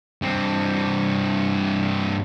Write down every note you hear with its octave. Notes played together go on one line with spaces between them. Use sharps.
G2 C4